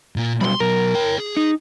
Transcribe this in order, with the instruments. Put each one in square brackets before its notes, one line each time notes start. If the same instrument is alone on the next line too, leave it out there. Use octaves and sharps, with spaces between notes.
[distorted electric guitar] A#2 A#3
[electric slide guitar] B2 F#3 G3 [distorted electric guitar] B5 C6
[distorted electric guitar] B2 F#3 [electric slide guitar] A#4
[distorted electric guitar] C#5 G5
G#4
[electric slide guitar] D#4